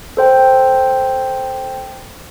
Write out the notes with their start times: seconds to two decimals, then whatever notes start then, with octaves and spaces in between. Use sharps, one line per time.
0.17 A4 C5 G5